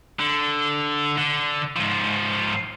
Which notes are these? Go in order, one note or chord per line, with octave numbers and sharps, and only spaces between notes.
D3
D3
G#2 F3